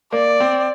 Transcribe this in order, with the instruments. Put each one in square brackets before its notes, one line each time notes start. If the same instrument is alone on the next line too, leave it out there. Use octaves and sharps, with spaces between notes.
[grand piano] A#3 [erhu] D5
[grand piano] C4